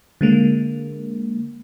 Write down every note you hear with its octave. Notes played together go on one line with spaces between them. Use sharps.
D3 G#3 A#3